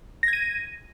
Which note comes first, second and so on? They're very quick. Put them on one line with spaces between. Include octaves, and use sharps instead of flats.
A#6 G#6 D#7